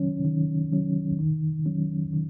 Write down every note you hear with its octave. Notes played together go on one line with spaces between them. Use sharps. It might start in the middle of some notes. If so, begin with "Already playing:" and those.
Already playing: D#3 F#3 C#4
D#3
F#3 C#4
D#3
F#3 C#4
D#3